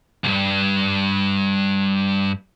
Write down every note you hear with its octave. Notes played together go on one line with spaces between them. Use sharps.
C#2 G2